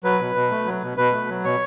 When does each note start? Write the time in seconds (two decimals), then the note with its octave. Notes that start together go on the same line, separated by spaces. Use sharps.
0.04 F#3 B4
0.20 B2
0.35 B2
0.51 A3
0.66 F#3
0.83 B2
0.97 B2 B4
1.13 A3
1.29 F#3
1.44 B2 C#5